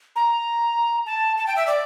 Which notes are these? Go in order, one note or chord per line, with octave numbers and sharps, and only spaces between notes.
A#5
A5
A5
G5
E5
D5